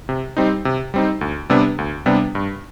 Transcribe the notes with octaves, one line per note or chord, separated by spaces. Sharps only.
C3
G3 C4 D#4
C3
G3 C4 D#4
D2
C3 G3 B3 D4
D2
C3 G3 B3 D4
G2